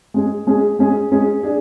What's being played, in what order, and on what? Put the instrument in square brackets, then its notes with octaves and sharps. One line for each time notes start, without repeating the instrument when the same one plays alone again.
[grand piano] G#3 C#4 G#4
G#3 C#4 G#4
G#3 C#4 G#4
G#3 C#4 G#4
D4 G#4